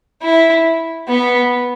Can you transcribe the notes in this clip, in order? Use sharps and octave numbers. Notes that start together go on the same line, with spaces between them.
E4
B3